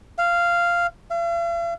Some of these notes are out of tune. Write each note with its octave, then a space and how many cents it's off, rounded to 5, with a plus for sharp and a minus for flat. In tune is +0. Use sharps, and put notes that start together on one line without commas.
F5 -10
F5 -45